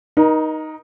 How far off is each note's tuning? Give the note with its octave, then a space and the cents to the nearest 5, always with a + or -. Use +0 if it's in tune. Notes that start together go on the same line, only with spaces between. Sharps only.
D#4 +0 A#4 +35